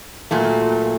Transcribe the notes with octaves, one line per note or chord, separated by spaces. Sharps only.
A#2 F#3 A3